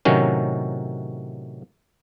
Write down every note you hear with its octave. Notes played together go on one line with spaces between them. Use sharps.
A2 C3 D#3 F#3 C#4